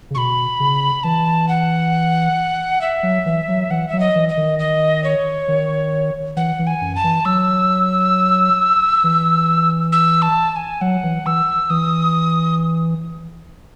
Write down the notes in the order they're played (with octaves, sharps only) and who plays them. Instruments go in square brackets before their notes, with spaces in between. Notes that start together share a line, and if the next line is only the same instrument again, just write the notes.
[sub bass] C#3
[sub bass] B2 [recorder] B5 C#6
[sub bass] C#3
[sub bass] E3 [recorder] A5
[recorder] F#5
E5
[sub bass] F#3
E3
F#3
[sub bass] E3 [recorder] F#5
[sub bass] F#3 [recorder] E5
[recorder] D#5
[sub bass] E3
[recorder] D#5
[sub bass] D#3
[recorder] D#5
C#5
[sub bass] D#3
[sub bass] E3 [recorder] F#5
[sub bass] E3
[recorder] G#5
[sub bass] F#2
[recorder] A5
[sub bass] E3
[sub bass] F#3 [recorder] E6
[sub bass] E3
[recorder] E6
A5
A5
G#5
[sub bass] F#3 [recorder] F#5
[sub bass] E3
[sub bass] E3 [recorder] E6
[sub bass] E3 [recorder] D#6